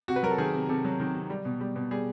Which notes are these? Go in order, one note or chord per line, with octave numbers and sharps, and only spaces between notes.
C3 F#4
B4
F#3 A#4
A4
D#3 G#4
C3
C3 A4
F#3
D#3
C3
G3
B2
G3
B2
G3 G#4